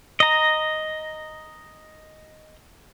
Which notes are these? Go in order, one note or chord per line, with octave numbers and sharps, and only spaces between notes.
D#5 A#5